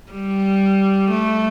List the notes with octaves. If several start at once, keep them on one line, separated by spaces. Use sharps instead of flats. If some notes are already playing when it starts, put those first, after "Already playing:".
G3
A3